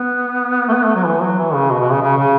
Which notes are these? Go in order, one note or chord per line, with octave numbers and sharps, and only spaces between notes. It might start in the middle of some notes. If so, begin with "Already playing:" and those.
Already playing: B3
A3
B3
A3
F#3
E3
F#3
E3
C#3
B2
B2
C#3
C#3
C#3